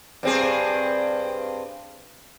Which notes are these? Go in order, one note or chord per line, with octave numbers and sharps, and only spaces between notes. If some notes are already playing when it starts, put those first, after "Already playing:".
G2 C4 G#4